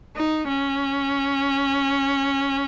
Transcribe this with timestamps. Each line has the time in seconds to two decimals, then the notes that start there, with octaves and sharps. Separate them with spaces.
0.16 D#4
0.48 C#4